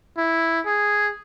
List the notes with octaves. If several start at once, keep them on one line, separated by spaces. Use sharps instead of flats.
E4
G#4